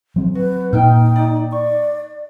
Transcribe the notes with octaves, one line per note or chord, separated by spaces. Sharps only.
F#3 C4
F#4 B4
A#2 D#4 G5 F6 G6
D5 D#6
D5 C#6